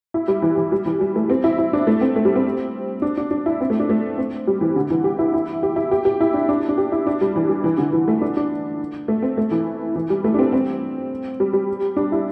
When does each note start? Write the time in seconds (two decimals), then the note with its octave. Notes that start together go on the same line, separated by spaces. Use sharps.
0.14 E4
0.28 G3
0.42 E3
0.57 E3
0.72 G3
0.86 E3
1.01 G3
1.16 A3
1.30 C4
1.44 E4
1.58 E4
1.73 D4
1.87 A3
2.01 C4
2.16 A3
2.25 G3
2.35 C4
3.02 D4
3.17 D4
3.31 D4
3.46 E4
3.61 C4
3.70 A3
3.80 D4
3.89 A3
4.18 C4
4.47 G3
4.61 E3
4.76 D3
4.90 E3
5.04 G4
5.19 E4
5.33 E4
5.63 G4
5.76 E4
5.91 G4
6.05 G4
6.21 E4
6.34 D4
6.49 D4
6.69 D4
6.78 G4
6.92 E4
7.07 D4
7.21 G3
7.36 E3
7.49 G3
7.64 E3
7.78 D3
7.93 E3
8.08 A3
8.21 D4
8.37 D4
9.08 A3
9.22 C4
9.37 A3
9.51 E3
9.96 E3
10.10 G3
10.24 A3
10.34 D4
10.39 C4
10.53 C4
11.40 G3
11.53 G3
11.97 D4
12.12 E4